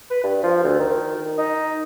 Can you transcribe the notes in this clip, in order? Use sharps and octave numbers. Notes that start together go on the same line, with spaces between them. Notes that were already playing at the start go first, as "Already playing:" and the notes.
B4
G2
F3
D2
D#3
D#4